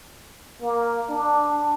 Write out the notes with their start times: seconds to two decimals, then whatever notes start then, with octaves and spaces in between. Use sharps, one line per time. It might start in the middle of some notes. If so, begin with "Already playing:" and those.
0.60 A#3
1.10 D4